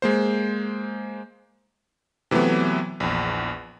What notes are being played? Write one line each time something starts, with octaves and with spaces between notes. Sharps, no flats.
G#3 A#3 C5
C3 E3 F#3 A3 B3
A#1 E2